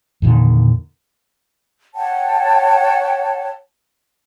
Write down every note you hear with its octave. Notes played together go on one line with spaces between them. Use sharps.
E2 A#2 D3 D#3
C#5 F#5 G5 A5